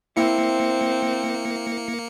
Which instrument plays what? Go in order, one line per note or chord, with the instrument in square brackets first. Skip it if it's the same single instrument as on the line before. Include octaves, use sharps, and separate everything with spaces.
[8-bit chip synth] A#3 C#7 [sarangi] C4 [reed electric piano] E4 E5